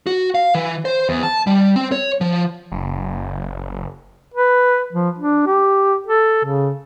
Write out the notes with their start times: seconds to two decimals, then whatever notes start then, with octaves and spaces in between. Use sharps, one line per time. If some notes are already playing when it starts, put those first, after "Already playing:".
0.07 F#4
0.35 F5
0.55 E3
0.85 C5
1.09 E2
1.23 A5
1.47 G3
1.76 C4
1.92 C#5
2.21 F3
2.72 F#1
4.34 B4
4.93 F3
5.18 D4
5.46 G4
6.07 A4
6.45 C#3